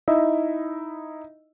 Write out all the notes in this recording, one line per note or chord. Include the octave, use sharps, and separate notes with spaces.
D#4 E4 D#5 E5